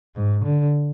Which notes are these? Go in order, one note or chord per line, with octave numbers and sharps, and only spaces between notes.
G#2
D3